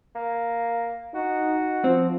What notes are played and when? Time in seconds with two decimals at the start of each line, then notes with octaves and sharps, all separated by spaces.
0.15 A#3
1.14 D#4 F#4
1.84 F3 C4